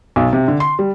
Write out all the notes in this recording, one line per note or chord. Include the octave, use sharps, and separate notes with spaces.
B1
C3
D3
C6
G3